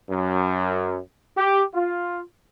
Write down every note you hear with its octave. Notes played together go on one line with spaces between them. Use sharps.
F#2
G4
F4